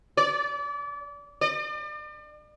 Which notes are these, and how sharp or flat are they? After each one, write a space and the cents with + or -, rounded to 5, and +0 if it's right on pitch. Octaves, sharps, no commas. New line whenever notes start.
D5 -30
D5 +40